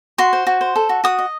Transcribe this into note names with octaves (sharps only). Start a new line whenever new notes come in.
F#4 C6
C5
F#4
C5
A4
F#4
F#4 D#6
D#5